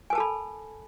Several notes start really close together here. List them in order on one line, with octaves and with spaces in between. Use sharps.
G#5 A#4 A5 A4 B5